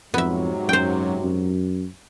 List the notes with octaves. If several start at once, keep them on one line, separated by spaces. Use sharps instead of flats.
F2 G#2 C3 F#3 B3 E5
F#2 C5 G5
F#2